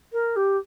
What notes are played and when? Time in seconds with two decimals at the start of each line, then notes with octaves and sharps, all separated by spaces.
0.13 A#4
0.36 G4